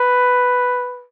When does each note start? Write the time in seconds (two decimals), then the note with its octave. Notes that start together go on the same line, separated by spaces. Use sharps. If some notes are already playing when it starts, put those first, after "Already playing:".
Already playing: B4